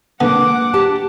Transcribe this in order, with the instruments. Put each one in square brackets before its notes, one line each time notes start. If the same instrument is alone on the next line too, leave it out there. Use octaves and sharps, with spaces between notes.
[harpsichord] D3 B3 [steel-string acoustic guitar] G#3 A#3 D4 [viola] F#5 D6
[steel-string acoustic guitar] G4 A5